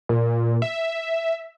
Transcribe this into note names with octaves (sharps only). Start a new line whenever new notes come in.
A#2
E5